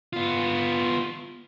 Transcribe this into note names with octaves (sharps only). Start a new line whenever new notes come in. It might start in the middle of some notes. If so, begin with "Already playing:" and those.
B3 F4